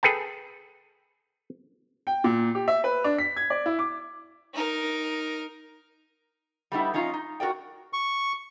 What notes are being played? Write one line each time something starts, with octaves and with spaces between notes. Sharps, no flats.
G#4 A4 B4 G5 A5
G5
A#2
G4
E5
B4
D4
B6
G#6
D5
E4
D6
D#4 A#4
G3 A3 B3 C#4 D#4 E4
F3 C#4 D#4 F4
D#4
F#4 A#4 D5 G5
C#6